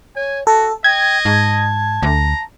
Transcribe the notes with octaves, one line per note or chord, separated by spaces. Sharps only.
C#5 G#5
F#4 A4 A5
D#5 G5 G#6
G#2 A5
D2 A#5